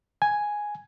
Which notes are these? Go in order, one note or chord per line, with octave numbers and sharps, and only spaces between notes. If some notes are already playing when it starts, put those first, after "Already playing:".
G#5